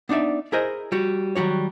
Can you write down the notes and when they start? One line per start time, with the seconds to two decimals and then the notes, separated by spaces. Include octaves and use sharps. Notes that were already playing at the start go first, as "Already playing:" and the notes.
0.09 B3 D4 D#4 D5 E5
0.52 E4 G#4 A#4 C5 D#5
0.92 G3 F#4
1.35 D#3 F#3 G3 F#4 C#5